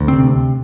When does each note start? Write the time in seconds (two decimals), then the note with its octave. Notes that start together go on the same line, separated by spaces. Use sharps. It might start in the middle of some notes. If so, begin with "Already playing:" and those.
Already playing: D2
0.08 C3 C4